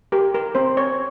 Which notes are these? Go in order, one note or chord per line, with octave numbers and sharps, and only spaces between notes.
G4 A#4
A#4
C4 C5
C#5